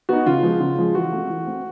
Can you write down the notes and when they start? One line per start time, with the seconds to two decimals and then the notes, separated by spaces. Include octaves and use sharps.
0.09 B3 D#4 F#4
0.26 C#3 F4
0.43 F3 G#3
0.60 C#3
0.78 F3 G#3
0.94 E3 F#4
1.12 A3 C4
1.30 E3
1.47 A3 C4